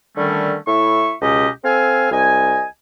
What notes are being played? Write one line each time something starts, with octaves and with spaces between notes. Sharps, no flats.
D3 D#3 G3 A3 C#4
A2 E4 E5 C#6
C#2 B2 C#4 G4 D#5
C4 A4 F5 G#5
C2 D#5 G#5